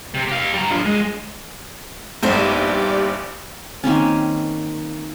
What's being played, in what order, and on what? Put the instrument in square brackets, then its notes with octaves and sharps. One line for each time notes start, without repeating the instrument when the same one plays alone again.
[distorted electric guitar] C3
G4 F5
G3 A#5
D4 F4
G#3
[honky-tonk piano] A#1 G2 [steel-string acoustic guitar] B3 D#4 C5 [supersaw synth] G4 D5
[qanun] D#3 A#3 C4 C#4